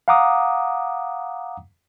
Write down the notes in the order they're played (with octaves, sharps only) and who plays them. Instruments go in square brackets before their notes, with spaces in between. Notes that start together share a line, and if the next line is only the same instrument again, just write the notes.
[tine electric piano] F5 F#5 A#5 D6 D#6